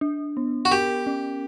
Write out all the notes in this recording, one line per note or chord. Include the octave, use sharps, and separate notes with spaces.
D4
B3
F#4
G4 A#4
C#4